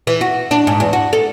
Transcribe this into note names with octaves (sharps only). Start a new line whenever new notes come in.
E3
F#4
D4
G#2
E2
F#4
A4